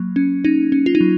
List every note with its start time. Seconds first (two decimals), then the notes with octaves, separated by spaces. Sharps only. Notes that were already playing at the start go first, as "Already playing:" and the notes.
Already playing: F#3 A#3
0.16 C#4
0.44 C#4 D#4
0.72 C#4
0.86 F4
0.95 D#4
1.01 F#3